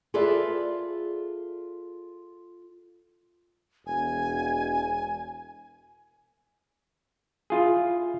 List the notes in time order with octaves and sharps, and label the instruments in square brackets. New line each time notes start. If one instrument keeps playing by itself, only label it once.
[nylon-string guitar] F4 G#4 A4 B4 D5 E5
[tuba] E1 [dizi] G#5
[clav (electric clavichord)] E4 F4 G#4